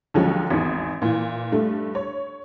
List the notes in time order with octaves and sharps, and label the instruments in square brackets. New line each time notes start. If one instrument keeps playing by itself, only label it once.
[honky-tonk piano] D#2 D3 F3 F#3 G#3 C#4
G#1 E2 D#3
A#2 E3
G2 A3
C#5